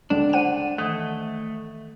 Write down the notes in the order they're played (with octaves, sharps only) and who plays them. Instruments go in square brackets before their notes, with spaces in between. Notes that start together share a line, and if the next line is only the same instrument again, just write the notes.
[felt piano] C#2 D3 [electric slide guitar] D4
[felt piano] C5 [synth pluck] F#5 D#7
[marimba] D#3 E3 [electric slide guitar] A3 [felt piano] D#6